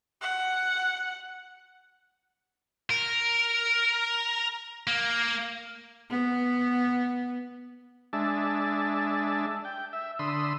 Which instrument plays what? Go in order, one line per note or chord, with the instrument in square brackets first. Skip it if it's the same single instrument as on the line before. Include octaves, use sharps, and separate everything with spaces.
[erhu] F#5
[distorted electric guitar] A#4
A#3
[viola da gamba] B3
[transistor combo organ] G#3 D4 E5 A5
G5
E5
D3 B5 C6 D#6 E6